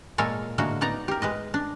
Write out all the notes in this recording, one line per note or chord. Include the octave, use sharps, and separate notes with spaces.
A#2 G#3 A4 A#4 C#5 G#5
A2 D3 G#3 A#3 F#4
B3 D#4 D5 A#5
G4 A#4
G#3 B4 D#5
D4